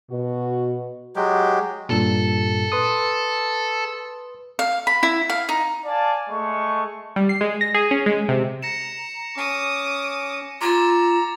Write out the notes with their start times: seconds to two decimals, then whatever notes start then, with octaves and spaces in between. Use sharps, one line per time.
0.11 B2 F#4
1.16 F#3 G#3 G4
1.90 G2 A#2 A4
2.72 B4 C6 D#6
4.59 F5
4.87 B5
5.03 E4
5.30 F5
5.49 D#4
5.85 D5 F5 G#5 A5
6.29 G#3 A3 C#6
7.16 G3
7.29 C7
7.41 G#3
7.61 A#6
7.74 G#4
7.91 C#4
8.06 G#3
8.29 C3
8.63 A#5 A#6 C#7 E7
9.36 C#4 D6 D#6
10.61 F4 A#5 D6 E6 G#6 A6